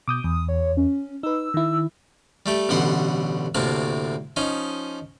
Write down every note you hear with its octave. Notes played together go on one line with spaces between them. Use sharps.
B2 D6 D#6 G6
E2 D#6
C#5
C#4
D#4 B4 E6
D#3 E4
G3 A3 G4
A1 B2 D3 G3 F#5 C6
D2 A2 C3 A#3 A5
F3 C#4 D#4 D#5